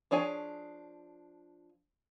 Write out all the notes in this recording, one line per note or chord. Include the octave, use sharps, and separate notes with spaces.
F3 D4 G#4 C#5 G#5